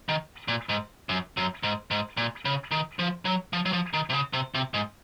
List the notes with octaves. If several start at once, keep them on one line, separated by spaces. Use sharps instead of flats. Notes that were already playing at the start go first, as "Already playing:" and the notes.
D#3
A#2
G#2
F#2
F#2
G#2
G#2
A#2
C#3
D#3
F3
F#3
F3
F#3
F3
D#3
C3
C#3
C3
C3
G#2